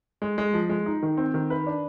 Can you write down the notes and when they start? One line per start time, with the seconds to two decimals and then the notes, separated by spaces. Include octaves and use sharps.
0.22 G#3
0.38 G#3
0.53 F3
0.69 G#3
0.86 D#4
1.03 D#3
1.17 C4
1.34 D#3
1.50 B4
1.67 D4